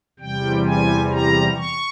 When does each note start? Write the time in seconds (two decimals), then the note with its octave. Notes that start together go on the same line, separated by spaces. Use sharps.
0.20 E2 C3 G3 G5
0.65 G#5
1.12 A#5
1.58 C#6